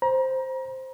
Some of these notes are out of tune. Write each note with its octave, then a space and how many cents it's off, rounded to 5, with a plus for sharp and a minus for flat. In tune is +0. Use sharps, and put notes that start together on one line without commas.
C5 +0 A#5 +35